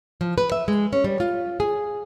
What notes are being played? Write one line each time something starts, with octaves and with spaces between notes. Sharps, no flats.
F3
B4
E5
G#3
C#4
G3
F4
G#4